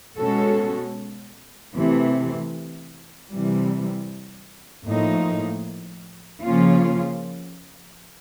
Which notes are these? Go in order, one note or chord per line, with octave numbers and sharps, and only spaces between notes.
B2 G#3 C#4 F#4 A4
C3 E3 A3
C3 E3 G3
A2 F3 A#3 D#4
C#3 F3 A#3 C#4 F4